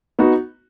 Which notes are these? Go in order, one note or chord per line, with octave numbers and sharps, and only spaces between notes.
B3 D#4 F#4